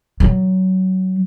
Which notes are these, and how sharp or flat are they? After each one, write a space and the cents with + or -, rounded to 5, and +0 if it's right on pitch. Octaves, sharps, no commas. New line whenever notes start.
F#3 +20